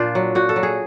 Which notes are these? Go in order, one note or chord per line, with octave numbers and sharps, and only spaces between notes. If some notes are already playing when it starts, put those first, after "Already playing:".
Already playing: A#2 D4 F4
F#3
A#2 F#4
A4
F#3
G#4